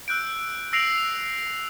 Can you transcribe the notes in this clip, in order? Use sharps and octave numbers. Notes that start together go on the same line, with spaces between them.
E6 F#6 G6 D7
E6 A#6 C7 D7 F7 F#7
F7